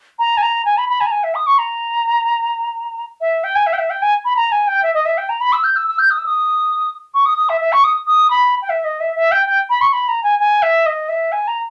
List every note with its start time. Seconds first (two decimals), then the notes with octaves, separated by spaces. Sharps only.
0.19 A#5
0.37 G#5
0.42 A#5
0.65 G#5
0.77 B5
0.89 B5
1.00 G#5
1.07 A#5
1.11 G#5
1.24 E5
1.35 D#6
1.47 C#6
1.58 A#5
3.21 E5
3.44 G5
3.55 G#5
3.66 E5
3.73 G5
3.79 E5
3.90 G5
4.02 G#5
4.25 B5
4.36 A#5
4.52 G#5
4.67 G5
4.83 E5
4.94 D#5
5.05 E5
5.18 G5
5.29 A#5
5.41 B5
5.52 E6
5.64 G6
5.76 E6
5.88 E6
5.99 G6
6.10 D#6
6.18 E6
6.26 D#6
7.14 C#6
7.26 D#6
7.38 D#6
7.49 E5
7.61 E5
7.72 C#6
7.84 D#6
8.07 D#6
8.30 B5
8.62 G5
8.69 E5
8.84 D#5
9.00 E5
9.16 E5
9.31 G5
9.46 G5
9.70 B5
9.81 C#6
9.93 B5
10.08 A#5
10.23 G#5
10.39 G#5
10.62 E5
10.86 D#5
11.09 E5
11.32 G#5
11.48 A#5